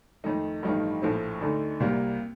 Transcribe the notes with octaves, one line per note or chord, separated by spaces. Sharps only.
F2 D#3 A3 D#4
A1 G2 F3 A3 D#4
A#1 A2 F3 A3 C4
D2 D3 A3 D#4
C2 C3 G3 A#3